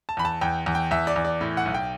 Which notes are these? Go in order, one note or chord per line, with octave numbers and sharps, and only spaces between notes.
A5
E2 B5
A5
E2 G5
E2
G5
E2 E5
D5
E2
D5
A2
F#5
B1
G5